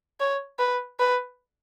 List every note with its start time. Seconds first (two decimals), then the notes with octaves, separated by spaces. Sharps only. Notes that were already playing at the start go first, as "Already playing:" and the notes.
0.20 C#5
0.59 B4
1.00 B4